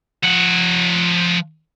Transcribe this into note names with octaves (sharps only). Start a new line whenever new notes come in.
F3 F#5